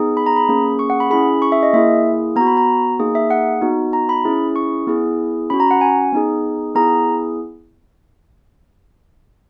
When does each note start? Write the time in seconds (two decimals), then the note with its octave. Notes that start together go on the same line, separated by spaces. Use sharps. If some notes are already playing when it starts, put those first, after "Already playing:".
Already playing: B3 D#4 G#4
0.17 B5
0.26 A#5
0.36 B5
0.49 A#3 C#4 G#4
0.79 C#6
0.90 F#5
1.00 B5
1.10 C#4 E4 G#4 B5
1.42 C#6
1.52 E5
1.63 D#5
1.73 A#3 E4 G#4 E5
2.36 B3 A#5
2.41 F#4
2.47 B5
2.57 A#5
3.00 A#3 D#4 G#4
3.15 E5
3.30 F#5
3.62 B3 D#4 F#4
3.93 A#5
4.09 B5
4.25 C#4 E4 G#4
4.56 C#6
4.87 B3 E4 G#4
5.50 C#4 F#4 B5
5.60 A#5
5.71 F#5
5.81 G#5
6.12 B3 D#4 G#4
6.75 B3 E4 G#4 A#5